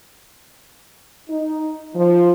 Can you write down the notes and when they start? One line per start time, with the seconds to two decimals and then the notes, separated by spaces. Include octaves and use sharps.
1.30 D#4
1.95 F3